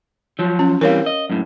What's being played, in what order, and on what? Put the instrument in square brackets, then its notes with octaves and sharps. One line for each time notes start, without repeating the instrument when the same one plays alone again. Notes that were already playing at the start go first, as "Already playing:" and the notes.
[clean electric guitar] F3 F#3
[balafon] C#4
[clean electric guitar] E3 G3 C4 [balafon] A#4 C#5 F5
[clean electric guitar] D#5
F#2 A2